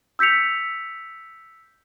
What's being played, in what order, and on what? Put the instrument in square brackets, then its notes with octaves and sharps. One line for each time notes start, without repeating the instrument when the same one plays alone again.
[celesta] E6 G6 B6 C#7 F7